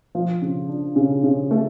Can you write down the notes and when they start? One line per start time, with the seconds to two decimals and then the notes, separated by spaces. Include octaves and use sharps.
0.15 F3
0.42 C#3
0.69 D4
0.96 C#3
1.23 C#3
1.51 A3